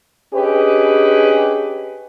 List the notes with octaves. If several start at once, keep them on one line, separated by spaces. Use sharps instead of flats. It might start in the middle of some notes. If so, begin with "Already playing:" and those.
C#4 D4 G4 G#4 B4 D#5